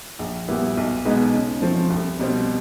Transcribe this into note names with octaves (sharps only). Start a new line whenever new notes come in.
A#1
A#2 G3 B3 E4
B1
B2 G#3 B3 D#4
C#3
F3 A3 C4
C2
B2 G3 C4